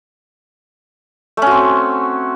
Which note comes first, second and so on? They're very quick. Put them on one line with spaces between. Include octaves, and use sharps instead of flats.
A3 C#4 F#4 C4